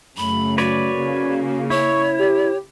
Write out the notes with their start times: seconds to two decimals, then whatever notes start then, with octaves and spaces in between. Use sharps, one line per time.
0.17 F#2 C#3 A3 B5
0.58 F#4 B4 C#5 D5
0.95 C#3 A#3
1.70 E4 C#5 C#6
2.19 G4